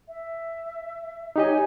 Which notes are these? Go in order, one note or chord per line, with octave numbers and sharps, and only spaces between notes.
E5
D#4 G4 C#5 D#5 G#5